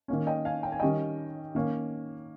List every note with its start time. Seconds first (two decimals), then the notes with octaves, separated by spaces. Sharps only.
0.08 D#3 A#3 C#4
0.27 D#5 G5
0.45 F5 G#5
0.63 G5
0.72 G#5
0.80 D#3 G3 C#4 D#5 G5
1.55 D#3 A#3 C#4